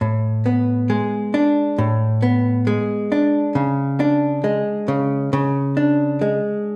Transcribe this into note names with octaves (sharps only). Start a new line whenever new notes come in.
A2
B3
G#3
D4
A2
B3
G#3
D4
C#3
D4
G#3
C#3
C#3
D4
G#3